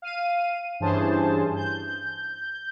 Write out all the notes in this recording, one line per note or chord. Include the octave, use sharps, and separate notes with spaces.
F5 D#7
G2 E3 C#4 G#4 C5 A5
G6